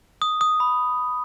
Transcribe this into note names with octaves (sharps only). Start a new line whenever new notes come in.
D#6
D#6
B5